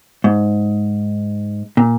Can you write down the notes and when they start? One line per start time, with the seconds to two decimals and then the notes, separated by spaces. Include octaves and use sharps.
0.24 G#2
1.77 A#2